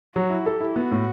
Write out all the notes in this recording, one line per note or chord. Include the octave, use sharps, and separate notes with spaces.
F#3 F#4
E4
G4 A4
E4
B3 F#4
A2